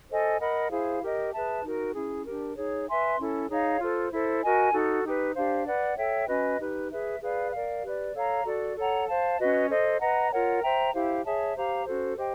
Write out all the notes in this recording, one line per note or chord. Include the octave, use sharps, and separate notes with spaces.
A4 C5 D#5 G#5
A#4 D#5 F#5 B5
E4 G#4 C5 F5
G4 A#4 D#5
G#4 B4 E5 A5
D#4 F#4 A#4
C#4 E4 G#4
D4 G4 A#4
D#4 G#4 C#5
B4 E5 G#5 C6
C#4 E4 A4
D#4 G#4 C#5 F5
F4 A4 C5
E4 A4 C5
F#4 A#4 D#5 G#5
D#4 F#4 A4
D#4 G4 B4
D4 G4 C5 F5
B4 D5 F#5
A4 C#5 E5 G5
C#4 F#4 B4 D#5
D#4 G4 B4
G#4 B4 E5
G#4 B4 D5 F5
A#4 D5 F5
G4 B4 D5
A4 C#5 F5 A#5
F#4 A4 D5
A4 C#5 F#5 A#5
C5 F5 A5
C#4 F#4 B4 D#5
A4 C5 D#5
B4 D#5 F#5 A#5
F4 A#4 C#5 F#5
C5 E5 G5 A#5
E4 G4 C5 F5
G#4 C#5 E5 A5
G4 C5 F5 A#5
C#4 F#4 A4 C5
G4 C5 D#5 G5